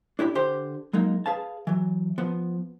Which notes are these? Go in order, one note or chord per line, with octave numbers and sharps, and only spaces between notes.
D4 E4 G4 B5
D3 G4 C5 C6
F#3 G#3 A#3 D#4
G#4 B4 F5 A5
E3 F#3
F3 B3